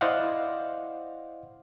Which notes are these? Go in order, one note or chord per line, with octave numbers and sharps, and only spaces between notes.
E4 C5 D5 D#5 F5 F#5